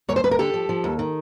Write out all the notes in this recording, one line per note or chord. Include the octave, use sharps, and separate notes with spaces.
D#2 C#5
C5
D#2 B4
A#4
D3 G4 A4
F3
F3
D#2
D#3